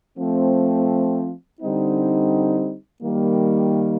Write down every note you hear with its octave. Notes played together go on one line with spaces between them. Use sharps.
F3 A3 C4
D3 G3 C4 D#4
D#3 G3 A#3